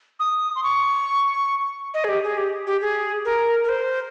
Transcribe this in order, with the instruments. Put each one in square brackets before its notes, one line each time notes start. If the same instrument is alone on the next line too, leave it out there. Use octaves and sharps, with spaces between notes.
[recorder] D#6
C6
C#6
D#5
G#4
G4
G#4
G4
G4
G#4
A#4
A#4
C5